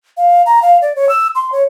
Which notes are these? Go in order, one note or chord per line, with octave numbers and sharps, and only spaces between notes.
F5
A#5
F5
D5
C#5
E6
C6
C#5